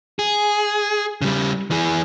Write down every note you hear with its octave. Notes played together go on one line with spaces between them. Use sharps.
G#4
C#3 G3
E3 G#4